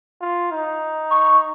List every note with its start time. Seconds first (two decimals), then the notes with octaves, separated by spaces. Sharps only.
0.21 F4
0.52 D#4
1.11 C#6